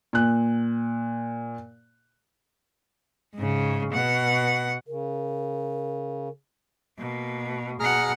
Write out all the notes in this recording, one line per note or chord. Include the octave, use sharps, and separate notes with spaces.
A#2 F#6
G#2 C#3
B2 F#5
C#3 A#4
B2 A#3
B2 G#4 F#5 A#5 F6